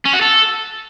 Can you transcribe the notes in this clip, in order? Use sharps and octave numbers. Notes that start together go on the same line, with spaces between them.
C#4
F#4
A4